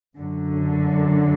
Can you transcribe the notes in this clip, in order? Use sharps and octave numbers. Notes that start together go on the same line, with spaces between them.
F#2 D3 F#3